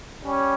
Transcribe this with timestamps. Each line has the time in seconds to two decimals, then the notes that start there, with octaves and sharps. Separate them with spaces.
0.25 G3 C#4